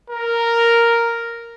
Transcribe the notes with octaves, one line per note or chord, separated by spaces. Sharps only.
A#4